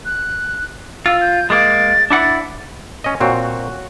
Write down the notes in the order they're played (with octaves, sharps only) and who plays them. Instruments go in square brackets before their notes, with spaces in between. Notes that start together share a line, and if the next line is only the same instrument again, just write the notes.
[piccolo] F#6
[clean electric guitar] F4 [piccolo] E6
[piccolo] G6
[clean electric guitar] G#3 A#3 [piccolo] A6
[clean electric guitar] D4 E4 F#5 [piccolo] A6
[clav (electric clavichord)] C#4 D#5
[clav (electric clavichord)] A#2 C4 [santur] F#4 C#5